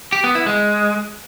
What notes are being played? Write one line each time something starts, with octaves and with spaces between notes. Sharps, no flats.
G4
B3
E4
G#3